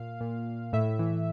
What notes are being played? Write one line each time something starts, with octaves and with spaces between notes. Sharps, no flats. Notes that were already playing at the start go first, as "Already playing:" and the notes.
Already playing: A#2 F5
A#2
A2 E5
E3